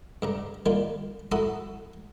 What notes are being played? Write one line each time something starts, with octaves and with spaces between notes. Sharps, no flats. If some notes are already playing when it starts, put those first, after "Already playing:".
G2 C#3 A#5
D#3 G3 A#3 F4
E4 F#4 A4 F#5 A#5 D#6